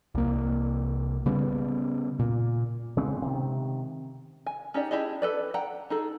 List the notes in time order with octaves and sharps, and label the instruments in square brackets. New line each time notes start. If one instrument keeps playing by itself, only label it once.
[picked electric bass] C2 A#3
C#3 G3 B3
A#2
[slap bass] C#3 G#3 B3 C4
C3 D#3
[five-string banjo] G#5
C#4 D#4 G4 D5
D4 E4 G4 G#4 D#5
A4 B4 D5
F#5 G5 A#5
D#4 G#4 A4